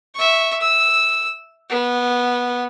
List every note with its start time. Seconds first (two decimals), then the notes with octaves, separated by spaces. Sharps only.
0.15 E5 C#6
0.61 E6
1.70 B3